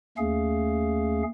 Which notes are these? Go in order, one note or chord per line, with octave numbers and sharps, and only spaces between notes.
D#2 A3 C#4 G#4 F5